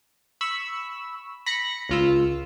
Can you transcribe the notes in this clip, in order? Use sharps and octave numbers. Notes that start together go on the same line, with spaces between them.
B5 C#6 E6
B5 A#6 C#7
C#2 F4 E6